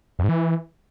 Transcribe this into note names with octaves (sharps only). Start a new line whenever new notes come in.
F2
G#2
E3